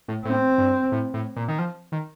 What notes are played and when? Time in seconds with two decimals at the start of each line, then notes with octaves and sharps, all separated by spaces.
0.08 A2
0.25 A2 C4
0.58 G2
0.92 A2
1.14 A2
1.36 A#2
1.48 D#3
1.59 F3
1.92 D#3